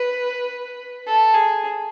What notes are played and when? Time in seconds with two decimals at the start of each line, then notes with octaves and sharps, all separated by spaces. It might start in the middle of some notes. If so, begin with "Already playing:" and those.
Already playing: B4
1.07 A4
1.35 G#4